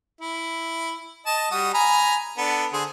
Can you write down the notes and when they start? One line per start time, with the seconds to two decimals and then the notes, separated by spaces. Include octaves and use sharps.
0.21 E4
1.26 D#5 A5
1.51 G3 F#4 D#6
1.74 G#5 A#5 B5
2.38 B3 D4 A4
2.73 D3 G#4 C5